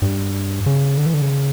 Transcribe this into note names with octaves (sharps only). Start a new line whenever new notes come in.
G2
C#3
D3
E3
D3
C#3